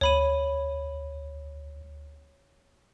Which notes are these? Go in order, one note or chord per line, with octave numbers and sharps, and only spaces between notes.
D2 C#5 B5 D#7